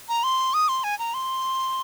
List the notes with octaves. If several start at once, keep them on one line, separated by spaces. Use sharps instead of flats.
A#5
C6
D#6
C6
G#5
A#5
C6